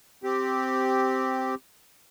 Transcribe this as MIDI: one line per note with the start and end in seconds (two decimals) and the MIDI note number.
0.23 1.55 60
0.23 1.55 67